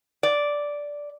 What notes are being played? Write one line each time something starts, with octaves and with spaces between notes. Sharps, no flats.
D5